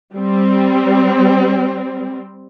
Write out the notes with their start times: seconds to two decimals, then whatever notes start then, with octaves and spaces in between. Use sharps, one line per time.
0.15 G3 C4